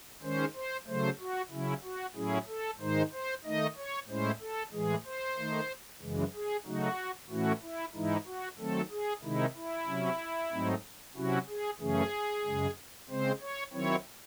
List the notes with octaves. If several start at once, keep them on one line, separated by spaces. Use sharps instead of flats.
D#3 G#3 C#4 C5
C5
C#3 F#3 A3 C5
F#4
C#3 F#3 C#4 E4
F#4
A2 F#3 C#4 E4 G#4
A4
G#2 D#3 G#3 D#4 C5
C5
D#3 A3 D#4 D#5
C#5
A2 G#3 C#4 E4 C5
A4
A2 E3 G#3 G#4
C5
D#3 A3 D#4
F#2 C#3 E3 G#3
G#4
C#3 F#3 A3 D#4 F#4
A2 E3 A3 C#4 E4 F#4
E4
G#2 E3 G#3 D#4 E4
F#4
D#3 F#3 A3 C4 A4
G#4
C3 D#3 G#3 D#4 E4
E4
C3 F#3 C#4
G#2 F#3 A3 C4 D#4
C3 F#3 C#4 E4 F#4
G#4
F#2 C#3 E3 A3 C#4 G#4
F#2 C#3 G#3
C#3 G#3 C4 C5
C#5
D#3 F#3 C4 E4 C#5